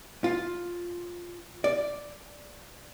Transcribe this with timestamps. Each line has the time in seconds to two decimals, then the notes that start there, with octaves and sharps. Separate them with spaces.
0.24 F4
1.64 D5